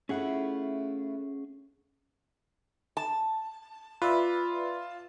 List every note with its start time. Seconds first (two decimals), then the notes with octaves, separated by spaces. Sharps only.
0.09 A3 C#4 E4 F4 G#4 F#5
2.97 A5
4.02 F4 B4 D5 E5